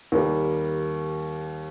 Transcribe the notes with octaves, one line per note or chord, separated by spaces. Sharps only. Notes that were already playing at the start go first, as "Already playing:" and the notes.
D#2 D#3 G3 A#3